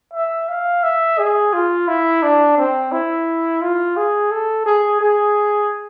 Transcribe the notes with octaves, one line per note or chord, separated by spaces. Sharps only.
E5
F5
E5
G#4
F4
E4
D4
C4
E4
F4
G#4
A4
G#4
G#4